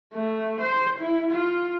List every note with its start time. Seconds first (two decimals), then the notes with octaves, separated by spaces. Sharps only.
0.14 A3
0.61 C5
0.99 E4
1.31 F4